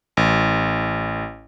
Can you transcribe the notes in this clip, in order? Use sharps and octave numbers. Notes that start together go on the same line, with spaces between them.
A1